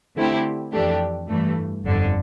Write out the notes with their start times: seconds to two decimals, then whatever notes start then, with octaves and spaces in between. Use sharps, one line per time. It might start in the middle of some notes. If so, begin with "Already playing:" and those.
0.16 D3 A3 C4 E4 G4
0.73 F2 E3 A3 D4 G4
1.29 G2 E3 A3
1.86 G1 F2 D3